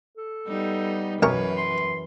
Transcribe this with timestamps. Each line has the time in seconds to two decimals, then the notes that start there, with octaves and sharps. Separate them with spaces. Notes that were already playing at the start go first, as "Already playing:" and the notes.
0.17 A4
0.48 G3 B3 D#4
1.22 B1 F#2 E3 A#4 B4 C#5 C#6
1.57 C6